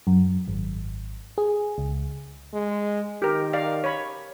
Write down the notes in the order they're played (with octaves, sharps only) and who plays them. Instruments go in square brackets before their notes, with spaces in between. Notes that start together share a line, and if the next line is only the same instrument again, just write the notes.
[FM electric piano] F#2
G#1
G#4
C#2
[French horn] G#3
[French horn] D#3 [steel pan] G4 A#4
[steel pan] A#4 D5 F5
C#5 B5